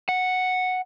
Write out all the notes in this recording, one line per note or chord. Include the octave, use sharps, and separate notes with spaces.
F#5